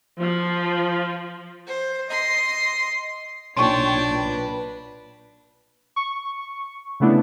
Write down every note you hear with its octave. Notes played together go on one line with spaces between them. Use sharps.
F3
C5
D#5 C6
B1 A#2 D4 C#5 G5 C6 C#6
B4
C#6
C#3 A3 B3 D4 E4